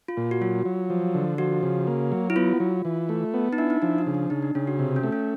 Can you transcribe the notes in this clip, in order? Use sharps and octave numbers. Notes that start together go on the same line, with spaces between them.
F4
A#2
F#4
F#3 F4
F#3
F3
D3
F3 F#4
C#3
A#3
F#3
E4
B3 F4
F#3
E3
A3
B3
D#4
D4 E4
D#4
F3 D4
D4
C#3
D4
C#3 D#4
D4
C#3 C#4
F#4
C3
C#4
A3
C#4